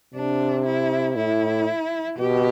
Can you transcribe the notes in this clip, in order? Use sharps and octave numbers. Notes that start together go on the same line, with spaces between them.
C3 D4
E4
A2 E4
B2 G4